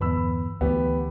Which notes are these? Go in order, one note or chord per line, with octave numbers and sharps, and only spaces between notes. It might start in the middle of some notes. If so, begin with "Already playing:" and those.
G1 E2 B4 B5 E6
D2 E3 A3 B3 G4